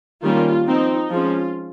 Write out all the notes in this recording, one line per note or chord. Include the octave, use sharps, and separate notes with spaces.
D#3 G3 A#3 C#4 F4
F3 C4 D#4
F3 G#3 C#4 F4